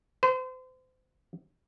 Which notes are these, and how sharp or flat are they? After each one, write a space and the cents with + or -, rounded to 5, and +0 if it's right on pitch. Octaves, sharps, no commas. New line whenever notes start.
C5 -35